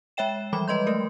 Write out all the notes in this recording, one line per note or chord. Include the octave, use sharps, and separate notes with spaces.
G#3 C#5 E5 G5 E7
E3 F3 G3 B5 D6
G#3 B4 D#5 C6 G6
A3 A#4